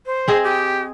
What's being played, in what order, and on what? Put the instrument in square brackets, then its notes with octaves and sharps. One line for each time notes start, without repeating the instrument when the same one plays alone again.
[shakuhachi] C5
[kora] C4 G#4 D#5
[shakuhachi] G4